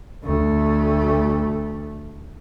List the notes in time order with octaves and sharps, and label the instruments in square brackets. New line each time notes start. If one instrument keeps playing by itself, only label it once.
[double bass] D2 A3